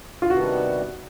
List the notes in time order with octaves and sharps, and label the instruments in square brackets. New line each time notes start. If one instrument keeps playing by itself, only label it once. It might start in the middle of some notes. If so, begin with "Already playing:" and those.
[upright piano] F4
[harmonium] C3 D#3 G3 B3 D4 [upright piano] F#4